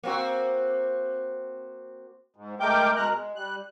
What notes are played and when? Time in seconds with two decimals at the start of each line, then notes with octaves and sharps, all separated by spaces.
0.03 A#3 C4 F#4
2.36 G#2
2.60 G#3 A3 A#4 G5 D6 G6
2.96 B2 G#3 A#4 A#5 F#6
3.14 G#3
3.36 G3 F#6